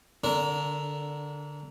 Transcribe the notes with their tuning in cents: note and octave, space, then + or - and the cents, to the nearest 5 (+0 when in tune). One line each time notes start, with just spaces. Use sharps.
D3 +0 D4 -35 A#4 +0